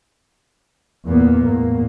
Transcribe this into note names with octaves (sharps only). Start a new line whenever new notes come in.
E2 A#2 A#3 B3
E2 A2 A#3